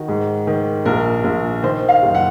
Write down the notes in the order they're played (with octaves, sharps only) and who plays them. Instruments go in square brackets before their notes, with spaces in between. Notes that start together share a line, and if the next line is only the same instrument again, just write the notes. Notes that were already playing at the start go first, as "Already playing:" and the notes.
Already playing: [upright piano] D#3 F#4
G#2
D#3
A#1 A#4
A#1
D#3 C5
F5
F#1
F#5